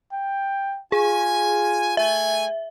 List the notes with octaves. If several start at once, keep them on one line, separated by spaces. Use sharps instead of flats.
G5
F4 G#4 G#5
A3 E5 G#5